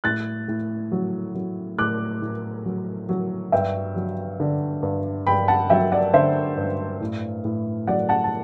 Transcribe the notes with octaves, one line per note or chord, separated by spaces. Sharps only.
A2 F#6 A6
A2
F#3
F#3
A2 D6 F#6
A2
F#3
F#3
G2 E5 G5
F#3
D3
G2
G2 G5 B5
F#5 A5
F#3 E5 G5
D5 F#5
D3 C5 E5
G2
A2
A2
F#3 D5 F#5
F#5 A5
A5